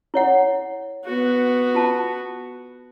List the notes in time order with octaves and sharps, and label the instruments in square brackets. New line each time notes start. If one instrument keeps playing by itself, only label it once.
[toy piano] E4 C#5 F#5
[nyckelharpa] B3 F#4
[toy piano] F4 A5